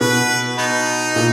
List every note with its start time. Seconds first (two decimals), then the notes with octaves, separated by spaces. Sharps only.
0.01 B2 B4
0.57 B3 D#4
1.16 A#2